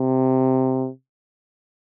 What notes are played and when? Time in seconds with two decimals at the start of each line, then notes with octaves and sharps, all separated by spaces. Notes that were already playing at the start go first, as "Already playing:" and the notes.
Already playing: C3